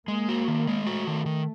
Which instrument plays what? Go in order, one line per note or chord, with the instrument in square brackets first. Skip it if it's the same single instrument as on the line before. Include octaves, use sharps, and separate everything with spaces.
[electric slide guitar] G#3 [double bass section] A#3
[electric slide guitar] F#4
D#3
G#3
[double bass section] A3 [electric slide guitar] F#4
[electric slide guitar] D#3
D#3